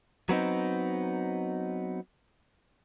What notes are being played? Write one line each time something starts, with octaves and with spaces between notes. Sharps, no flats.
F#3 B3 C4 D#4